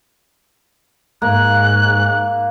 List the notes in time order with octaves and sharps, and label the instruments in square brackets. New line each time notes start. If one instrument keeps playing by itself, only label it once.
[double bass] G#2 [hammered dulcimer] A#3 [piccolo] F#6